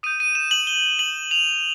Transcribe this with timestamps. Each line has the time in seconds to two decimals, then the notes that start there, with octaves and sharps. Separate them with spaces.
0.03 D#6 G6 D#7
0.20 D#7
0.35 E7
0.51 F#7
0.67 G7
0.99 F#7
1.31 F7